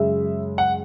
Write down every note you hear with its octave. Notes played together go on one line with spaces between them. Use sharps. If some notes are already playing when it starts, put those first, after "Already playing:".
Already playing: F#2 C#3 G#3 E5
F#5